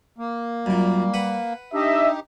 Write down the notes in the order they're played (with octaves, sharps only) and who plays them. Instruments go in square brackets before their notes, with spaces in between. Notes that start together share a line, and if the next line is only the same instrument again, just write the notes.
[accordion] A#3
[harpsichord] F#2 A#2 [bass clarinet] G3
[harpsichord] B4 F#5
[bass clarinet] D4 [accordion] D#4 G4 [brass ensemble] D#5 E5